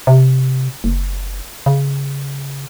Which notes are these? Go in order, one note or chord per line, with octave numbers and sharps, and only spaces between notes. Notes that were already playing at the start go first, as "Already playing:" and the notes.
C3
F#1
C#3